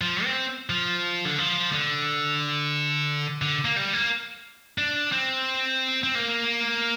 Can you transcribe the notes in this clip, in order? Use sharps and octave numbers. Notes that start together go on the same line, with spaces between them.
F3
C4
F3
D3
F3
D3
D3
A#3
G3
A#3
D4
C4
C4
A#3